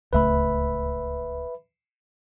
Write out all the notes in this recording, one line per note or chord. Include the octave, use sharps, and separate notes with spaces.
D1 C#2 A3 B4 E5 B5